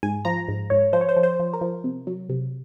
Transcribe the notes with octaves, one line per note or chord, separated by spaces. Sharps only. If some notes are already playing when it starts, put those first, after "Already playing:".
G#2 G#5
F3 A#5
G#2
G#2 C#5
F3 C5
C#5
C5
F3
C5
F3
A#4
F3
C3
F#3
C3